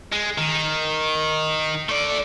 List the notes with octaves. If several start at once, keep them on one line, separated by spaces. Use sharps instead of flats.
G#3
D#3
A3 D5